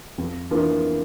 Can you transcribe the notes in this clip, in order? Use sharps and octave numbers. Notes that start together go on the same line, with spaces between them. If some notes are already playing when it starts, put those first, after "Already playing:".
F2
E3 A#3 D4 F4